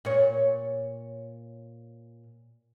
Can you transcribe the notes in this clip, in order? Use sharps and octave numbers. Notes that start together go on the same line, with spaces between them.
A#2 C#5